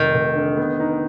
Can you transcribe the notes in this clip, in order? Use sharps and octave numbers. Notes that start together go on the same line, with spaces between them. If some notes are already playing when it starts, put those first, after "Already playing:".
Already playing: F1 D#3
F1
D3
B3
D#4